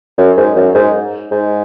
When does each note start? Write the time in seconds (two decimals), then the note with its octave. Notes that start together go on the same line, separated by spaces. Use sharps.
0.18 F#2
0.37 G#2
0.56 F#2
0.75 G#2
1.32 G#2